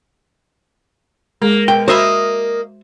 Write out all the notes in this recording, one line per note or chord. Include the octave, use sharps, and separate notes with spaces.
G#3 A#3 G#4 A#4
B2 G5
A#3 F#4 C5 D#5 E5 B5